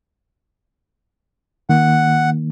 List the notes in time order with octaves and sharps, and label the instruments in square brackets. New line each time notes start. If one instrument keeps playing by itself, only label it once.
[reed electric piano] D#3 A#3 [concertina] F#5